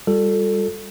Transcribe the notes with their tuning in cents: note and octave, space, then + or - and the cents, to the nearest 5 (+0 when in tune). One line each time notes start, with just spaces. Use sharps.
G3 +15 F4 +45 A4 +5